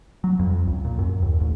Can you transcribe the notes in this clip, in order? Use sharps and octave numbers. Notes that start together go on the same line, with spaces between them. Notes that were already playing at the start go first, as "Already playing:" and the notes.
F#3
F2
C#2
A#2
F#2
D#2
A1